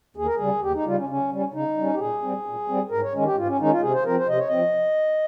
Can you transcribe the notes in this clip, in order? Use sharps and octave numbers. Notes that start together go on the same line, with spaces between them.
D#2 G#4
A#4
C#3 G3 G#4
D#2 G4
D#4
C#3 G3 F4
C#4
C#3 C#4
G3 C#4
C#3 D#4
G3 C#4
G4
A#2 G#4
G3 C4
A#2
G3 C4
G#2 A#4
C#5
D#3 G#3 C#4
G4
G#2 F4
C#4
D#3 G#3 C#4 D#4
F4
C3 G#4
C5
F3 C4 A#4
C5
C3 D#5
C#5
F3 C4 D#5